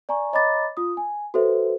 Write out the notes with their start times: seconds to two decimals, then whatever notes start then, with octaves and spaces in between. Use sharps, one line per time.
0.09 D5 G#5 A#5 C#6
0.33 C#5 D#5 A#5 B5 D6 A6
0.77 F4 D#6
0.97 G#5
1.34 F#4 A4 B4 C5 E5